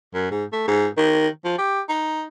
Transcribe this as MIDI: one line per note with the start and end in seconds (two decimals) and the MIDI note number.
0.14 0.29 42
0.31 0.44 44
0.52 0.67 57
0.68 0.87 44
0.97 1.28 51
1.45 1.55 53
1.58 1.80 67
1.89 2.24 63